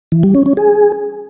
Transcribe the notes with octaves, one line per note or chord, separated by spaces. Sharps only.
E3
G3
C#4
C#4
G#4